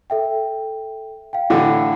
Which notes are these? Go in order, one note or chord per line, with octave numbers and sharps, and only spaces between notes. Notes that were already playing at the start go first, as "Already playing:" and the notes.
A4 E5 G5
F5 G5
A2 D3 E3